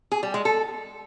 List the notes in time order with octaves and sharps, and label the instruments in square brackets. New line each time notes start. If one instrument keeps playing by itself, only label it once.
[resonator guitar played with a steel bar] G#4
G3
G#3
A4